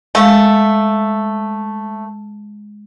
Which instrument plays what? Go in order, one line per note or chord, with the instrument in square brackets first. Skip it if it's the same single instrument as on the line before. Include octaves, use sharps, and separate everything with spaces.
[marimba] G#3 F5 E6 [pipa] A3